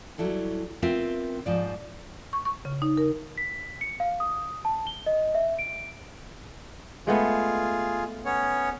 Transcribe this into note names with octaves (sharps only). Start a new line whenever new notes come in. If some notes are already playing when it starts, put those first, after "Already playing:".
F#3 G3 E4 A4
B3 C4 F4 A#4 E5
G#2 F3 D5
C#6
C#6
C#3
D#4
A#4
B6
C#7
F5
D#6
A5
G7
D#5
E5
D7
G#3 A3 B3 F4 G#4
B3 C#4 C#5